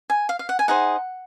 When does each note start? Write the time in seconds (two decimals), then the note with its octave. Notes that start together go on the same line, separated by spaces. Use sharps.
0.10 G#5
0.29 F5
0.39 F5
0.49 F#5
0.59 G#5
0.68 D#4 G#4 C5 F#5